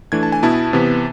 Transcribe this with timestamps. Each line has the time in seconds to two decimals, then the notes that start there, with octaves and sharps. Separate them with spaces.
0.12 E3 A3 D4 G#6
0.23 A5
0.32 G#5
0.43 B2 B3 E4 A5
0.73 C3 E3 B3